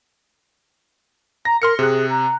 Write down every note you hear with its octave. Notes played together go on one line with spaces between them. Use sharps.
A#5 A#6
A#4 C6 F6 C#7
C3 G#4 F#6
A#5